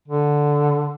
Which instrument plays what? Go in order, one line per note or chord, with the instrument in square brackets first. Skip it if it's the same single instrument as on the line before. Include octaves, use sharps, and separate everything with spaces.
[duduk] D3